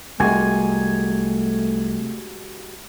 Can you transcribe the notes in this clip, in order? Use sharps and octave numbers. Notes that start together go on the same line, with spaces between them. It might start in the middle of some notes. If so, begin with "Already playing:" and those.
C2 G#3 A3 F#4 G4 G#5